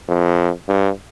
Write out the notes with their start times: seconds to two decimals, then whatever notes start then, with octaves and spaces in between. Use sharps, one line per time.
0.08 F2
0.68 G2